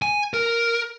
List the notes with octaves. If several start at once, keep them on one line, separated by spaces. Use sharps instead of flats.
G#5
A#4